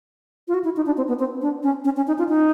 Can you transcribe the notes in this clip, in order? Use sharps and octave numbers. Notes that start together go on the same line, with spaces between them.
F4
F#4
E4
D#4
D4
C4
B3
C4
D4
C#4
C#4
C#4
D#4
F4
D#4